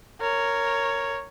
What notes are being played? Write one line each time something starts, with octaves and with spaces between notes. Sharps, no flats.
A#4 C#5